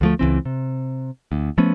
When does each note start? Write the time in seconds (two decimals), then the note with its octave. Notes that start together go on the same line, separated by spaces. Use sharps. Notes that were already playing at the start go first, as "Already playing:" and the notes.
0.01 D2 F3 A3
0.19 C#2 E3 C4
0.46 C3
1.32 D2
1.58 F3 A3 B3 C#4